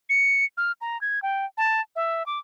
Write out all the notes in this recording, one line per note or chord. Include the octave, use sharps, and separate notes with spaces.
C#7
F6
A#5
G#6
G5
A5
E5
D6